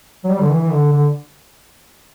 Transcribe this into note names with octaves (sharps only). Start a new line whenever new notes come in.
F#3
G3
D3
E3
E3
D3
D3